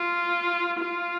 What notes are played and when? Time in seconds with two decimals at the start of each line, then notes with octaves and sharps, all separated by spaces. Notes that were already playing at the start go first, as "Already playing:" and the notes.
Already playing: F4
0.79 F4